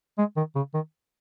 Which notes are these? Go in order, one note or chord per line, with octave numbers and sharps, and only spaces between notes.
G#3
D#3
C#3
D#3